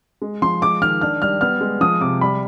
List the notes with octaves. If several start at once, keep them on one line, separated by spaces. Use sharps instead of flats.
G#3
F3 C6
G#3 D6
D#3 F6
D4 F6
G3 F6
B3 F6
G#3
F3 D#6
C3 D6
G3 B5